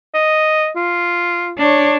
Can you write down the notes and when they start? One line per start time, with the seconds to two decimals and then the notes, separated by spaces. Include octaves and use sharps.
0.15 D#5
0.76 F4
1.58 D4 C#5